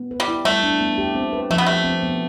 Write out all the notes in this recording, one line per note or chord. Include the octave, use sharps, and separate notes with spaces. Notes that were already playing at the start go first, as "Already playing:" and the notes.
Already playing: B3
B4
G3
E4
G3 A3
D4
B3
G4
C4
B4
F3 A3
B3
A3 G4
C4
B3